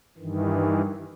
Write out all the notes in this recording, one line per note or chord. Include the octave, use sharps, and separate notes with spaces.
G2 D#3 E3